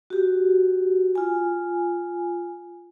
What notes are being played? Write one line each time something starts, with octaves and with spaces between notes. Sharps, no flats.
F#4 G4
F4 G#5